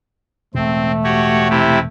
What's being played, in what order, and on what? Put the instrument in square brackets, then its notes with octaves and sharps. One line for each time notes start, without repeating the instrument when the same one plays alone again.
[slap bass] E1 A2 [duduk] A3 [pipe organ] C4
[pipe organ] F#4 G4 C#5
C3 E4 G4